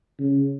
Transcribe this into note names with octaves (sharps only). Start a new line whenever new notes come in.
C#3